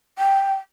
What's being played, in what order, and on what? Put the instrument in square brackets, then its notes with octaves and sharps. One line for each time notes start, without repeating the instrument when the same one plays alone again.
[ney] G5